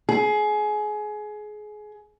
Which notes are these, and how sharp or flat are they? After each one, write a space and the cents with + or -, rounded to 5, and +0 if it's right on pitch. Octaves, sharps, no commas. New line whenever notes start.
G#4 +25